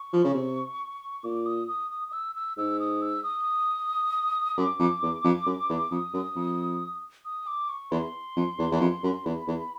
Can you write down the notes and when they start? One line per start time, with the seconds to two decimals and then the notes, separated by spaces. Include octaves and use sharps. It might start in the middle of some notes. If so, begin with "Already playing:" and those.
Already playing: C#6
0.13 F3
0.24 C#3
0.34 C3
1.24 A#2 D6
1.46 D#6
1.68 D#6
1.91 D#6
2.08 D#6
2.13 E6
2.35 E6
2.57 G#2 E6
2.80 D#6
3.02 E6
3.23 D#6
4.57 F#2 D6
4.79 F2
5.02 E2
5.24 F2
5.46 F#2
5.69 E2
5.91 F2 D#6
6.14 F#2
6.36 F2
7.25 D#6
7.47 D6
7.69 C#6
7.91 E2 C6
8.36 F2
8.59 E2
8.71 E2
8.80 F2
9.03 F#2
9.25 E2 B5
9.47 E2